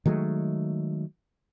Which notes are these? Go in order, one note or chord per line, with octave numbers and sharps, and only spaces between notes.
D#3 F#3 G#3 A3